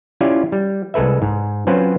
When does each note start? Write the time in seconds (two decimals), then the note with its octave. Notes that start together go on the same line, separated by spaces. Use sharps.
0.21 C#4 E4 F4 G4 D5 G#5
0.52 G3
0.94 C2 G#3 A4 B4 E5
1.22 G#2
1.67 F#3 C4 C#4 F4 B4 C5